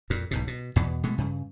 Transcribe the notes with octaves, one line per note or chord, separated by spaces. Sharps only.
F2 A#2
B1 G#2 B2
B2
E2 B2 B3
B2 G#3 A3
G2 C#3